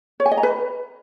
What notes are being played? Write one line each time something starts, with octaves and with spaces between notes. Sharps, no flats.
C#5
G#5
D#5
A#5
B4